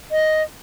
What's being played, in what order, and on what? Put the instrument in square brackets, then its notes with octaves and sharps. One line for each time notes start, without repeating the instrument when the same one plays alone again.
[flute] D#5